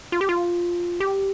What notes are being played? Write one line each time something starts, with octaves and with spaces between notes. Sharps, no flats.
F4
G4
F4
G4